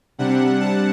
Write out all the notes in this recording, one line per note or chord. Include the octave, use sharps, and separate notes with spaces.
C3 G3 D4 F#5
A5